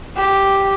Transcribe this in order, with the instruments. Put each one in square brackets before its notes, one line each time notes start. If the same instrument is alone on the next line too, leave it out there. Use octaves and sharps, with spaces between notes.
[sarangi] G4